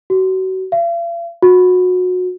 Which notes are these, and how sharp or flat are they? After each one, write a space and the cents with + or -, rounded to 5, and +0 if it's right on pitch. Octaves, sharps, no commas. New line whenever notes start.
F#4 +30
F5 -45
F#4 -25